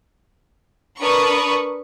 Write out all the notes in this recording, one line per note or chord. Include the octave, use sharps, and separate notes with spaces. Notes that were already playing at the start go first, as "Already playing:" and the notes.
D4 A#4 B4 B5 C#6 D#6